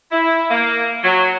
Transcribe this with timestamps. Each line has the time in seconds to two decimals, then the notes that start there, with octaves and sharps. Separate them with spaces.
0.12 E4
0.51 A#3
1.04 F#3